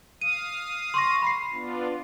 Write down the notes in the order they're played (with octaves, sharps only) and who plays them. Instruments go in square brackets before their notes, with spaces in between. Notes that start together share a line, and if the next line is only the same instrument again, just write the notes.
[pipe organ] F5 D#6 [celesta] D#7
[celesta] C6 C#6 A#6
B5 C7
[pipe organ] B3 D4 F4